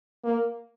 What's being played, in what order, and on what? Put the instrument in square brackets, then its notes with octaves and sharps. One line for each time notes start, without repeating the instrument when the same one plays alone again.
[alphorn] A#3